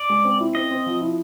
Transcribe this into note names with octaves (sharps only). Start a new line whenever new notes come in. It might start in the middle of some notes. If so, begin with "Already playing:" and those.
Already playing: D5
G#3
C4
E4
C4 D#5
C4
F3
E4